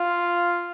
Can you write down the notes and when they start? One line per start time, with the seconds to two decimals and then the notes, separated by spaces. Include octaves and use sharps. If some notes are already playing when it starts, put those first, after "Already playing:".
Already playing: F4